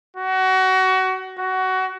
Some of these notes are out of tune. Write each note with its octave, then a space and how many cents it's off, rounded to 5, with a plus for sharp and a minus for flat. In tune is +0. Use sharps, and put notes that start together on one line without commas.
F#4 +25
F#4 +20